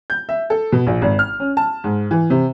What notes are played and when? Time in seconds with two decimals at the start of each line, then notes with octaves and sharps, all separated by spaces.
0.10 G6
0.29 E5
0.50 A4
0.72 B2
0.87 A#1
1.02 G#1
1.19 F6
1.40 C#4
1.57 A5
1.84 G#2
2.11 E3
2.30 C3